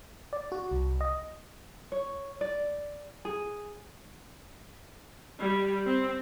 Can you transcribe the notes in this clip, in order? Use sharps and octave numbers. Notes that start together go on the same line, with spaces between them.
D5
F#4
C2
D#5
C#5
D5
G#4
G3
C4